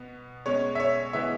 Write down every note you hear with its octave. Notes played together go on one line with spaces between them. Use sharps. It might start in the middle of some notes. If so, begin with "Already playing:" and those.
Already playing: B2 B3
B2 G#3 C#4 C#5
E5
C#5
E3 G#3 B3 E5